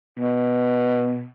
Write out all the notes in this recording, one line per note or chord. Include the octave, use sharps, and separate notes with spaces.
B2